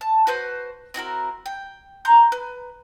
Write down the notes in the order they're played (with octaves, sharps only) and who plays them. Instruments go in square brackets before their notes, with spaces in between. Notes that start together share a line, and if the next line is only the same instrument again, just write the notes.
[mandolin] A5
F#4 B4 C5 G6
C4 E4 F#4 A#4
G5
A#5 C6 G6
B4